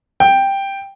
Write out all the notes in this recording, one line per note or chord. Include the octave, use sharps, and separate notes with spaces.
G5